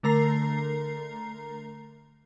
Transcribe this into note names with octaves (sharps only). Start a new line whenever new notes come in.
D3 A3 A#4 A#5 C7